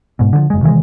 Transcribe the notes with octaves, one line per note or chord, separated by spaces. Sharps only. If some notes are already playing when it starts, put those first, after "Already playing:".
G#2 B2
D3 D#3 F3
F#1 G#3
C3 D#3 E3 G#3